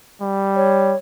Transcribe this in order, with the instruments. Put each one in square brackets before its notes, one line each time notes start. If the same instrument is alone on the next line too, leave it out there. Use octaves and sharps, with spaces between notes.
[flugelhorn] G3
[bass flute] C#5